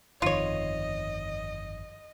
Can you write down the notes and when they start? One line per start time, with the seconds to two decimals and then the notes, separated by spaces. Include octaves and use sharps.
0.22 G1 F2 D#3 F4 C#5 D#5